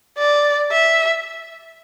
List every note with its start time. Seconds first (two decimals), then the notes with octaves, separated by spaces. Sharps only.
0.18 D5
0.71 E5